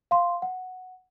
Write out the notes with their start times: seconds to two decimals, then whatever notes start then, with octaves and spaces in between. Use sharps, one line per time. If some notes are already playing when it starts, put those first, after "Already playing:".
0.11 F5 C6
0.42 F#5